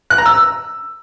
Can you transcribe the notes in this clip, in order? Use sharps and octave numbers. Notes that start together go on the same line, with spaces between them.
F#6
A#5
E6